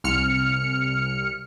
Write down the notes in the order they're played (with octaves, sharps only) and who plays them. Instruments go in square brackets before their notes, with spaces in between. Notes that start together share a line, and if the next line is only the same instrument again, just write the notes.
[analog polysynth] C2 F6 C#7